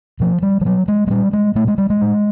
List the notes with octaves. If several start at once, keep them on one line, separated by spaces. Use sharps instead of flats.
B2 F3
G3
F3
B2 F#3
G#3
G#3
A#2 G3
G#3
A#2 A3
G#3
G3
G#3
A2